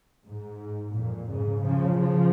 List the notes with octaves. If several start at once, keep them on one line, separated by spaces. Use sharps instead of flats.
G#2
F2 A#2
G#2 C#3
C#3 F3
C#3 F3